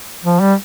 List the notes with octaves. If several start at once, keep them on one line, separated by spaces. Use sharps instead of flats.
F3
G3